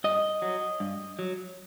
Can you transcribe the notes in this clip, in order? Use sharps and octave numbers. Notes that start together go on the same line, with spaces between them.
G2 D#5
F#3
G2
F#3